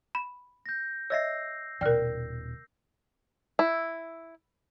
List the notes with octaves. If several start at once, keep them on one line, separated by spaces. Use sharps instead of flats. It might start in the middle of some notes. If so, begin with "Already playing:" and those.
B5
G6 A#6
C#5 D#5 E5 E6 A#6 C7
D#1 B2 A#4 D5 G5 F6
E4